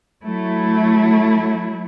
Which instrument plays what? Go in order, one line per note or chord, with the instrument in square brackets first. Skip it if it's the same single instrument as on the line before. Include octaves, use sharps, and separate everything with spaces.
[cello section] F#3 A3 E4